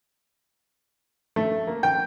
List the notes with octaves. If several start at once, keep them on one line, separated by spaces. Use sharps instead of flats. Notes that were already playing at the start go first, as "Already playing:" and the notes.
A3
A#3
G5